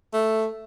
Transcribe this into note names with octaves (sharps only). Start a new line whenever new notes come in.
A3